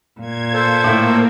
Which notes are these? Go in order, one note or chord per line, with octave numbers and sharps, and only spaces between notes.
A#2 G#6
A4 C5 A5
A2 A#3